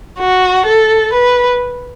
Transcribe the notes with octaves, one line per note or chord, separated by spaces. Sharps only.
F#4
A4
B4